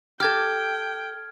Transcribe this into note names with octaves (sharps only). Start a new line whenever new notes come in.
G4 A4 G5 F6 G#6